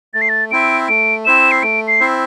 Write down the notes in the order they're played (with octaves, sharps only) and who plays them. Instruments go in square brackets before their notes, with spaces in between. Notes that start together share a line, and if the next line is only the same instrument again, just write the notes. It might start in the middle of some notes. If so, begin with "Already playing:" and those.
[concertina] A3 [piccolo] A6
[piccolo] C7
A6
[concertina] C4 E4 C5 E5 [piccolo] D7
[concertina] A3 [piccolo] D7
[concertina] C4 E4 C5 E5 [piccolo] E7
[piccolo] C7
[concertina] A3 [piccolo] D7
[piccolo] C7
[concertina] C4 E4 C5 E5